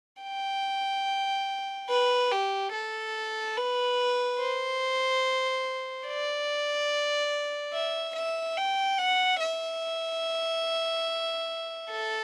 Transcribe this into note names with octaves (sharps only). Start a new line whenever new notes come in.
G5
B4
G4
A4
B4
C5
D5
E5
E5
G5
F#5
E5
A4